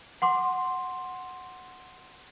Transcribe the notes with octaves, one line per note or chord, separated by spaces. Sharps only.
F#5 C6 D6